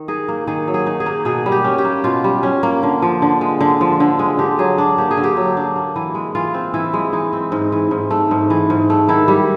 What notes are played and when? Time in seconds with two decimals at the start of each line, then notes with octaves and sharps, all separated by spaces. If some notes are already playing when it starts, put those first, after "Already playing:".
Already playing: D#3
0.08 D#4 G#4
0.28 A#3
0.47 D#3 G#4
0.67 F#3
0.74 G#4
0.87 D#4
1.00 G#4
1.06 A#3
1.25 B2 G#4
1.46 G3
1.52 G4
1.64 C#4
1.78 G4
1.85 A#3
2.04 B2 F4
2.24 G3
2.43 C#4
2.63 A#3
2.83 D3
3.02 F3
3.22 D3
3.41 G#3
3.60 D3
3.81 F3
4.00 D3
4.19 G#3
4.39 D3 G4
4.59 F#3 G#4
4.78 D4
4.98 A#3 G4
5.11 G#4
5.18 D3
5.24 G4
5.37 F#3
5.57 D4
5.76 A#3
5.96 E3
6.15 G#3
6.35 E3 F4
6.54 C4
6.74 E3 E4
6.93 G#3
7.13 E3 D#4
7.33 C4
7.52 G#2
7.72 E3
7.91 G#2
8.11 A3
8.31 G#2
8.50 E3
8.70 G#2
8.90 A3
9.09 D#3 E4
9.28 G3